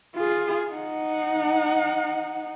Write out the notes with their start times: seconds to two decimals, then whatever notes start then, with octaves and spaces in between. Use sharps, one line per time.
0.16 F4 G#4
0.73 D#4 F#5